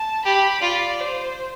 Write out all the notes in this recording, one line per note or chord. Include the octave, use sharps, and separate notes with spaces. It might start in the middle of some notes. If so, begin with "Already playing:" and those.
Already playing: A5
G4 B5
F4 D5
C5